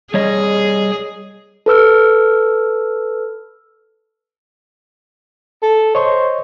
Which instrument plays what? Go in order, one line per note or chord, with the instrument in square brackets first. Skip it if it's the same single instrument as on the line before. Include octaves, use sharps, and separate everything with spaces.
[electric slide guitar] G3 C#5 D#5 [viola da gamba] G#4
[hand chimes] A4 B4 E6 F6
[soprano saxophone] A4
[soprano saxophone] C5 [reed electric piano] C#5 D#5 C#6